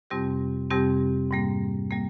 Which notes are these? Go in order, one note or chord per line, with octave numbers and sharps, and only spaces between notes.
F2 C3 G3 C4 G4
F2 C3 G3 C4 G4
G#2 G3 A#3
G3 A#3